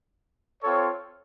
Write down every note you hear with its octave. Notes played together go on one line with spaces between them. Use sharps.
C4 F4 A4 C#5